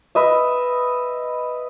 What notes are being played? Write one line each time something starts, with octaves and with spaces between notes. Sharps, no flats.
B4 D#5 E5